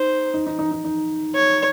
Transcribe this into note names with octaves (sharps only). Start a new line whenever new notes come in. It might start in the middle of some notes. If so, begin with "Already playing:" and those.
Already playing: D#4 C5
D#4
D#4
D#4
D#4
D#4
C#5